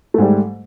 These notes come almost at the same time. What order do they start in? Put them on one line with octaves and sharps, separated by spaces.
A3 G#2 G3